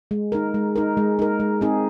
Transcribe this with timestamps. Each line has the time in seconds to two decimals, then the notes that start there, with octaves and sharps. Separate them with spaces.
0.11 G#3
0.32 D#4 A#4
0.54 G#3
0.76 D#4 A#4
0.97 G#3
1.19 D#4 A#4
1.40 G#3
1.61 C4 D#4 G#4